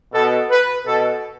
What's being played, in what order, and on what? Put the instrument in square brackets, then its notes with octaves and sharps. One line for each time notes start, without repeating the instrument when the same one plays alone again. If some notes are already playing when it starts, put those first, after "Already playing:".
[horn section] B2 A4
B4
B2 A4